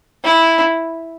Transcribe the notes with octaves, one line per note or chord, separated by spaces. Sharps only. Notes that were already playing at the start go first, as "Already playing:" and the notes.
E4